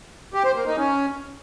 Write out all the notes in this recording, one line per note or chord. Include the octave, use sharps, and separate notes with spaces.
G4
C5
A#3
D#4
C#4